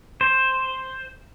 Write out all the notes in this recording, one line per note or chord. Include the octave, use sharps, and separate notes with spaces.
C5